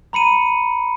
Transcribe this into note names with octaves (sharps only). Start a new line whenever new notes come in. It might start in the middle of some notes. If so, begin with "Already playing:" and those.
A#5 B5 C#7 D#7